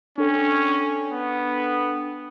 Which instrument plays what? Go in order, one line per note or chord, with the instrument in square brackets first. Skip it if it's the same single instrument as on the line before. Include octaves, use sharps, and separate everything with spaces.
[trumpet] C#4 [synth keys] D4 A4 G5
[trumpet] B3